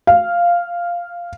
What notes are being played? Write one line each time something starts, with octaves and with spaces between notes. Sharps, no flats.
F5